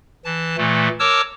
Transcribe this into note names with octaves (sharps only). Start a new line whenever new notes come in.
E3 A5
A#2 E3 A3
A#4 C#5 A5 D6 E6